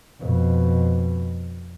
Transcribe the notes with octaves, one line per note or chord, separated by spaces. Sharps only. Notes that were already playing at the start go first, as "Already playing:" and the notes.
F2 B2